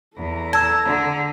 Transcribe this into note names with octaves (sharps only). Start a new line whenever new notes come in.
E2 A4 A#5
A5 E6 G#6
D3